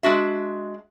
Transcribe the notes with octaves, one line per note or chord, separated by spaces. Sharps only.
G#3 D4 F#4 E5